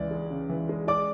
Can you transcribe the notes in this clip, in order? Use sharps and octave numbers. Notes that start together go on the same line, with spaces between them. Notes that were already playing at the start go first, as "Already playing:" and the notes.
Already playing: C#2 E3 D5
G#3
C#3
E3
G#3
G#3 D5 D6